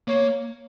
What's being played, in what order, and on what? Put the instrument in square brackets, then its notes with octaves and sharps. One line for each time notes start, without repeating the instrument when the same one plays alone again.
[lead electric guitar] A#3 [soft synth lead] C#5